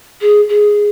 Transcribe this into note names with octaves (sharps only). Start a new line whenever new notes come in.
G#4
G#4